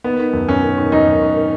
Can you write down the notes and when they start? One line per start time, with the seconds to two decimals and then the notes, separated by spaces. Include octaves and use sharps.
0.04 D#3 B3
0.19 D#3
0.33 F#2
0.48 F#2 C#4
0.63 D#3
0.78 D#3
0.92 F#2 D#4
1.07 F#2
1.22 D#3
1.36 D#3